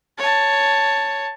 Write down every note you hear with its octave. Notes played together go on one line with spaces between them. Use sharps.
C#5 A5